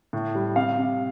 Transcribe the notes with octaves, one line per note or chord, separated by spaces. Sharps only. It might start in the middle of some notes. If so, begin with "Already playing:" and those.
A2
G3
C3 F5
C3